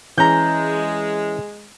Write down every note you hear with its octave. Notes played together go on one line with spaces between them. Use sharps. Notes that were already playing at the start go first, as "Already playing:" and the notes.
E3 G#3 C#4 A#5 G6